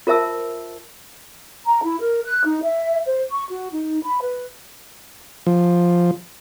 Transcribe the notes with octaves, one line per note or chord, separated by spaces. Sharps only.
F4 A#4 C5 E5 A5 E6
A#5
E4
A#4
F#6
D#4
E5
C5
C#6
F#4
D#4
B5
B4
F3